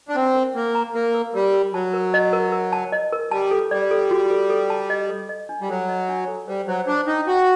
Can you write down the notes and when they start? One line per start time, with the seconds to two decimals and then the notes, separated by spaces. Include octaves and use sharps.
0.09 D4
0.16 C4 F#5
0.35 A#4
0.55 A#3 F#5
0.75 A#5
0.94 A#3 A#4
1.14 A#4
1.34 G3 A#4
1.54 A#4
1.73 F#3 A5
1.94 A#4
2.14 D#5
2.33 A#4
2.52 A#4
2.73 A5
2.92 D#5
3.12 A#4
3.31 G3 A5
3.51 A4
3.71 G3 D5
3.91 A4
4.11 F#4
4.31 A4
4.50 A4
4.70 A5
4.90 D#5
5.09 A4
5.29 D#5
5.49 D4
5.61 G3
5.69 F#3 A4
5.89 D#5
6.09 D4
6.28 A4
6.48 G3 C5
6.67 F#3 C5
6.87 D4 C5
7.07 D#4 G5
7.27 F#4 G5